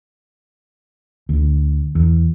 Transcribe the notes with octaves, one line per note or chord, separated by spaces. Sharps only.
D2
E2